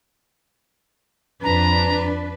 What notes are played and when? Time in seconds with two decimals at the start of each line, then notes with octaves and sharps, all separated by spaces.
1.44 F2 D4 B4 A#5